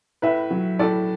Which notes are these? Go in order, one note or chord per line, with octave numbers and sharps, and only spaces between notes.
A2 B4 E5
F#3
A2 A4 D5